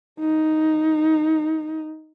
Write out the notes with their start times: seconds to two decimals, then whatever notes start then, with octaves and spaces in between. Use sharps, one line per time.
0.20 D#4